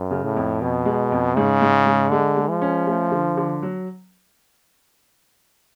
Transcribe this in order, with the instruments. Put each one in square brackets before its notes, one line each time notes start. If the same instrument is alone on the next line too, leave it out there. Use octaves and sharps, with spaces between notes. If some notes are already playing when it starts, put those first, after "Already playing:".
Already playing: [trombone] F#2
[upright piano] C#3
[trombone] A2
[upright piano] F2
[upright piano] F2 [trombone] B2
[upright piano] G#3
F2
[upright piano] G#2 [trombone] C#3
[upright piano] G#2
G#3
[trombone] D3 [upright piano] G#3
[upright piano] G#3
[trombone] F3
[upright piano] C#4
A3
D3
D3
F#3